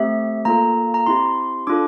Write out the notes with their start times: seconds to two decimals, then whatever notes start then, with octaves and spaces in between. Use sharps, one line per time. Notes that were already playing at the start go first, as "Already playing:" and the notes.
Already playing: A3 C4 G4 E5
0.45 A#3 F4 A4 A#5
0.94 A#5
1.06 C4 E4 G4 C6
1.67 D4 F4 A4 D6